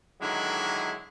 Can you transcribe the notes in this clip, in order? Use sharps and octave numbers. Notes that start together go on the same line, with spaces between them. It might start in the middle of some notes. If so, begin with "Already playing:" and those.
D3 D#3 F#3 G#3 A#3 E4